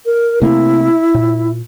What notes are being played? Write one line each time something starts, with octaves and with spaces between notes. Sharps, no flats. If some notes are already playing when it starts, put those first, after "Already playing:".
A#4
C3 A3 A#3 E4
A#2